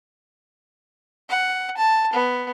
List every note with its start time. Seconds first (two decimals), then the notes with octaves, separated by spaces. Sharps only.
1.30 F#5
1.77 A5
2.13 B3